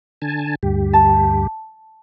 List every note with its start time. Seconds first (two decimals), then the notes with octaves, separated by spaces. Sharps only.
0.22 D3 G#5 A5
0.63 D2 G2 G4
0.93 A5